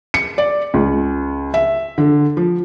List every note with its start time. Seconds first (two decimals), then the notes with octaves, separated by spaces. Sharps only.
0.14 C#7
0.38 D5
0.74 C#2
1.54 E5
1.98 D3
2.37 F3